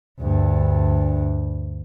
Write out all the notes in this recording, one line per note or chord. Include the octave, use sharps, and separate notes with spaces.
D2 G2